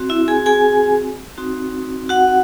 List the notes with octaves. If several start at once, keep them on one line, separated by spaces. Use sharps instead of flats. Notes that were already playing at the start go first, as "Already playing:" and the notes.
Already playing: C4 F#4
E4 E5
G#4 G#5
G#4 G#5
C4 D#4 F#4
F#4 F#5